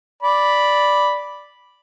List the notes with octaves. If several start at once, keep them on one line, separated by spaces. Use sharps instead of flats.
D5 B5